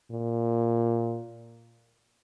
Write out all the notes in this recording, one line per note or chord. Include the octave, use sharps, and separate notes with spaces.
A#2